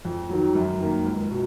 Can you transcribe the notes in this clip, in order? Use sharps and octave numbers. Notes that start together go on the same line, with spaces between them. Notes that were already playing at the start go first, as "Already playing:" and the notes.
F2
D#3 F#3
F#2
D#3 A#3
C#2
B2